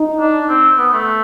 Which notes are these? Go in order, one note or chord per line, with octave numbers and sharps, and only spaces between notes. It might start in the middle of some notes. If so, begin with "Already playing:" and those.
Already playing: D#4
D4
C4
B3
A3